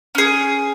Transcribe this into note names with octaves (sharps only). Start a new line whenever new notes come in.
C#4 G#4